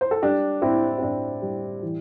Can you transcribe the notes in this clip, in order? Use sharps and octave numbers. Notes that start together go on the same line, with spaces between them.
C5
A4
G3 D4 G4
A2 C4 E4
C4
A2 D4
G3
E3